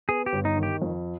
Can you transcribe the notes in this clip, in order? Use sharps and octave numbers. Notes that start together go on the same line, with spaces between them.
B3 G#4
G4
G1
D#4
D#3
G4
F2